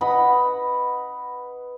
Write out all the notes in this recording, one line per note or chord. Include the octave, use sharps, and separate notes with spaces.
B4 D#5 F#5 B5